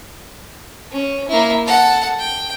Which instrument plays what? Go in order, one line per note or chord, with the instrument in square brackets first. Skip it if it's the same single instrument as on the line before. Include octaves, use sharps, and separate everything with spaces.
[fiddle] C#4
A#3 E4
A4 F#5
G5